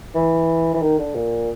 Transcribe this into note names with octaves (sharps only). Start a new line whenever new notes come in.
E3
E3
D#3
D3
A#2